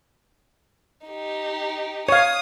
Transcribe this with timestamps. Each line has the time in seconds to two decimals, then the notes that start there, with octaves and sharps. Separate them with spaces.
1.07 D#4 G4
2.09 C#5 F5 D#6